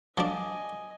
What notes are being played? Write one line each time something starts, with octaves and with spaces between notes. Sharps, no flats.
F3 D4 F#4 A4 D#5 F5 G#5